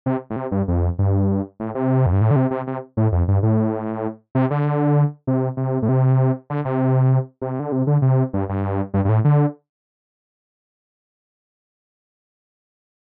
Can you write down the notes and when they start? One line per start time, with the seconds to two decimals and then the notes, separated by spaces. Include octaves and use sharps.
0.06 C3
0.30 A2
0.36 C3
0.51 G2
0.68 F2
0.99 G2
1.60 A2
1.75 C3
2.06 F2
2.13 G2
2.21 A2
2.31 D3
2.36 C3
2.51 C3
2.67 C3
2.97 A2
3.12 F2
3.28 G2
3.43 A2
4.35 C3
4.51 D3
5.27 C3
5.57 C3
5.82 A2
5.89 C3
6.50 D3
6.65 C3
7.42 C3
7.60 D3
7.72 C3
7.87 D3
8.02 C3
8.33 G2
8.49 G2
8.94 G2
9.05 G2
9.09 A2
9.25 D3